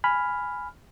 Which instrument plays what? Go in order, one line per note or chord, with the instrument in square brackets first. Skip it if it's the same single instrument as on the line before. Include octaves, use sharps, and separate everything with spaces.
[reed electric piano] G#5 B5 F6